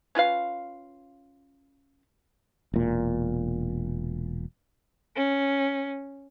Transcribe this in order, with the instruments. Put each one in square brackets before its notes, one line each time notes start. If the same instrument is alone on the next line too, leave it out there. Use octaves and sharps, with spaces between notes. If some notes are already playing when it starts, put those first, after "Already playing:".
[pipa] C#4 F4 B4 F5
[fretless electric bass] E1 A#2
[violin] C#4